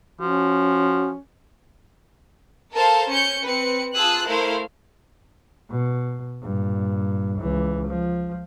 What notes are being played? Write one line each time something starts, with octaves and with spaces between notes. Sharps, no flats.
F3 C#4 F#4
A4 A#4 C5 F5 A5
C#4 G6 C#7
C4 B4 C#7
F4 G#4 A5 D#6 E6 F#6
A3 E4 A#4 C5 F5
B2
G2 A#2
C#2 E3
F3